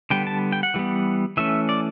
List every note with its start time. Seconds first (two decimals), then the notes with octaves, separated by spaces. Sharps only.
0.10 D3 G3 B3 G5
0.27 A5
0.52 G5
0.63 F#5
0.74 E3 G3 B3
1.37 E3 A3 C#4 E5
1.69 D5